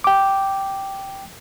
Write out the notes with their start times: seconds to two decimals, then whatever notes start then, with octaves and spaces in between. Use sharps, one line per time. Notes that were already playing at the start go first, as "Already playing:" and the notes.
0.04 G5 D6